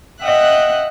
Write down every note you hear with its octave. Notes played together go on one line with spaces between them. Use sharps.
D#5 E5 F#5 G5 F#6